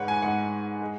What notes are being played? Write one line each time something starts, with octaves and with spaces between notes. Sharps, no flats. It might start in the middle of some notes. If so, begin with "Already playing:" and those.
Already playing: G#2 G#3 B4 C#5 F#5
G#5
G#2 G#3 F#5
G#3